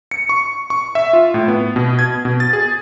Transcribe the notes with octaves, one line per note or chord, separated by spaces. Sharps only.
C#7
C#6
C#6
E5
F4
A2
B3
B2
G#6
B2
A6
G#4